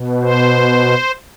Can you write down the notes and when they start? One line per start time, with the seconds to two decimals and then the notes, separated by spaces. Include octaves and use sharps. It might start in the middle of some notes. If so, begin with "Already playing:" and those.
Already playing: B2
0.22 C5